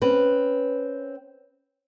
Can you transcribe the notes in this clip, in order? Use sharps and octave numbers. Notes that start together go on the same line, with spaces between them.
C4 C#4 B4